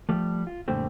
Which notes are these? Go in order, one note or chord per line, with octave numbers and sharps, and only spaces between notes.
F3 G3 A3
F4
F#2 A#2 D3 G3 A3 C4